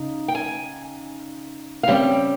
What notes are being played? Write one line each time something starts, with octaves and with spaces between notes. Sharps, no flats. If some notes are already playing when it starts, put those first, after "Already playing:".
Already playing: C#3 D#4
G5
G#5
F5
C#3 G3 C4 G5